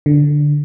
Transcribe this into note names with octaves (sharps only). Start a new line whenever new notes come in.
D3